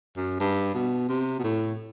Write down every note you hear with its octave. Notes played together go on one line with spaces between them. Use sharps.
F#2
G2
B2
C3
B2
A2